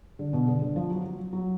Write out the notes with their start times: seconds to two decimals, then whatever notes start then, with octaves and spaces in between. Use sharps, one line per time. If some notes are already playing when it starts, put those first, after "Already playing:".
0.19 D3
0.33 B2
0.48 D3
0.62 D3
0.76 F3
0.90 F#3
1.05 F#3
1.33 F#3